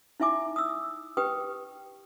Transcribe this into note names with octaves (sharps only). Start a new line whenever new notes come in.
D#4 E4 E5 G#5 D6
D#6 E6
G4 B4 G5 D#6